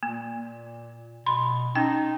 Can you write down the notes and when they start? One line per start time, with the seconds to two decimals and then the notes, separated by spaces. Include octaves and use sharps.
0.03 A#2 A#3
1.26 B2 B5 C6
1.75 C#4 D#4 G5